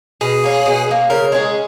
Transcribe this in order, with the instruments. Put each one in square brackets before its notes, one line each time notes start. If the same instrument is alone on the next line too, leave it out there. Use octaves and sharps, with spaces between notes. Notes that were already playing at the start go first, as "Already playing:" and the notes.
[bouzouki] B2 [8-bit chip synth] G#4
[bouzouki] A#3 C#4
B2
A#3 C#4
[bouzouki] C#3 [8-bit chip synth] A#4
[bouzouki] G#3 C#4 G#4